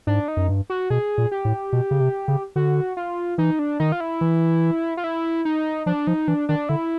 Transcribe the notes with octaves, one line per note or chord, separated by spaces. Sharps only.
G#2 D4
D#4
F#2
G2
F#4
B2 G#4
A#2
G4
A2
B2
C#3
C3
C#3
D3 F#4
F4
E3 D#4
D4
D#3 D#4
F4
E4
E3
F4
E4
D#4
F3 D4
F3 D#4
E3 D4
D#3 D4
D3 E4